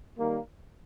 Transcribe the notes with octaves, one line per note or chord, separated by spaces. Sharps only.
D#3 G3 A#3